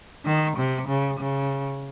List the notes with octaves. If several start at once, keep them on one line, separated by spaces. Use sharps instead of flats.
D#3
C3
C#3
C#3